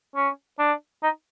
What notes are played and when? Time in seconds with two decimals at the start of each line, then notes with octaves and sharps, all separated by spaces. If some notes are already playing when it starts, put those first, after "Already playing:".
0.16 C#4
0.59 D4
1.03 D#4